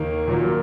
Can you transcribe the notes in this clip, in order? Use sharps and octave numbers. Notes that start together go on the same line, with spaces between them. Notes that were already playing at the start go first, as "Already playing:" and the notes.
Already playing: D#2 D#3 A#3 D#4
A#2 F#3 A#3